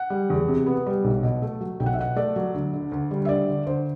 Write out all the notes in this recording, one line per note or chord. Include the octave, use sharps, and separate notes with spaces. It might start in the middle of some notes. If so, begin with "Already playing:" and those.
Already playing: F#5
G3
E2
C3
B3
G3
B1
B2
A3
F#3
B1 G5
F#5
E5
B2 F#5
A3 D5
F#3
D2
D3
D2
G3
E5
D2 D5
D3
D2 C5